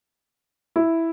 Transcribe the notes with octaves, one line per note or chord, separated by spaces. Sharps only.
E4